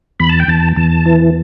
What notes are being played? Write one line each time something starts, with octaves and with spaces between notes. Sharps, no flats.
E2 B5
A5
G5
E2 A5
E2 A5
E3